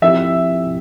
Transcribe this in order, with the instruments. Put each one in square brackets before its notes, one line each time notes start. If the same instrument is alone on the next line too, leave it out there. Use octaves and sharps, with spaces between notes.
[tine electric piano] F3 C4 E4 G4 [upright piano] E5